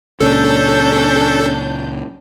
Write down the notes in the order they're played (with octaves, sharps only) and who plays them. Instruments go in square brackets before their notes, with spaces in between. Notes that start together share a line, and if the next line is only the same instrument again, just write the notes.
[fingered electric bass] C#2 A#2 [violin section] C#4 D4 G6 [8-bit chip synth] A4